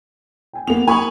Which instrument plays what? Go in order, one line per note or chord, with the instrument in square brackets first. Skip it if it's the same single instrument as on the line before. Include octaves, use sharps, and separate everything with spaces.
[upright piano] G5 G#5
[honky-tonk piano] A#3 F7 [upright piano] B3
[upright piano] A#3 D#6 F#7 [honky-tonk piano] G#5 B5 C#6